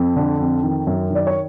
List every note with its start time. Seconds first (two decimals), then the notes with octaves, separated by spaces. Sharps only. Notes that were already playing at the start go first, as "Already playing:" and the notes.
Already playing: F2
0.16 D3
0.40 F2
0.63 D#3
0.87 F#2
1.10 D#3 D5
1.27 C#5